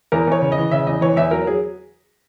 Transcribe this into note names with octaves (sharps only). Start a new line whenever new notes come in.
E2 A#4
E2 C#5
C#3
D#5
E3
C#3 E5
E2 D#5
E3 C#5
E2 E5
F#3 A#4
F#3 G#4